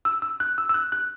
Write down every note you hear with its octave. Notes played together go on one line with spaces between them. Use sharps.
E6
E6
F#6
E6
E6
F#6
F#6